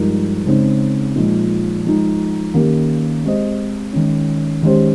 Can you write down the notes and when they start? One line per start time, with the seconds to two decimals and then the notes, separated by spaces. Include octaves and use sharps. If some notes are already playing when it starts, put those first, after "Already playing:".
Already playing: G2 F3 G#3 D#4 A#4
0.46 C#3 G#3 C4 D#4
1.15 A#2 F3 G#3 D#4
1.85 F3 G#3 D#4
2.54 D#3 A#3 C#4 G4 A#4
3.23 G#3 C4 G4 C5 D#5
3.93 D#3 G#3 C#4
4.62 D#3 G#3 C#4 G4 C5